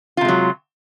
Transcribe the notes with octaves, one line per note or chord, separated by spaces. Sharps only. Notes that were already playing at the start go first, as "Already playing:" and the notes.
C3 F#3 G#3 F4